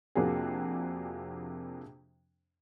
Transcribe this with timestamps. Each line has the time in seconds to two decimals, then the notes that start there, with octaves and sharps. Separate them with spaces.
0.15 F2 C3 A#3 D4 F#4 G#4